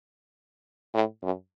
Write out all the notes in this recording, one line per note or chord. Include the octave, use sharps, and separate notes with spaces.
A2
F#2